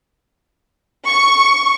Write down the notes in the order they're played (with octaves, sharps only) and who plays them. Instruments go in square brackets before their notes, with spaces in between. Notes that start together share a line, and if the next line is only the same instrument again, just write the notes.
[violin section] C#6